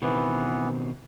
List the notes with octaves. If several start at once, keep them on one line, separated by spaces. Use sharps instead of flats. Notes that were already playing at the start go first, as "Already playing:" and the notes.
B2 D#3 E3 B3 C4